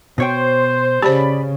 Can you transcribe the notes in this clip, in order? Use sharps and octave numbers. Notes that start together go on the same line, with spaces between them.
B2 C5 C#5 G5
C#3 G4 C5 D5 A5 B5